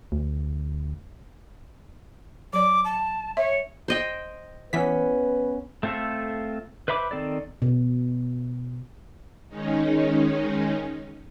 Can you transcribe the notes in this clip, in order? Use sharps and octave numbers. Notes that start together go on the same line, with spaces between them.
D2
F#3 D5 D6
A5
C#5 E5
C5 D#5 G5
E3 B3 C#4 B4 B6
A3 C4 F4 A4 E5
B4 C5 E5 B5 D6
D#3 C4 A4 D5
B2
D#3 G#3 C#4 D#4